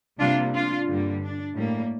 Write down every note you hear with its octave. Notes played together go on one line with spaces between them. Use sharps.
C3 G3 A#3 D4 F4
D4 F4
G2 D3 G3 A#3
D4
A2 G3 A#3